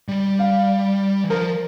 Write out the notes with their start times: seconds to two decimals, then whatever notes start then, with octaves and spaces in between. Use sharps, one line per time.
0.08 G3
0.39 F5
1.24 E3
1.30 F3 A#4